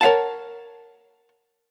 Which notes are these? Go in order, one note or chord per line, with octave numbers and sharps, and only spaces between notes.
A#4 C#5 F5 F#5 A5